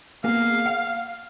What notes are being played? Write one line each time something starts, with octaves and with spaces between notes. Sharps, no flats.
A#3 B3 G#4 F5
F#5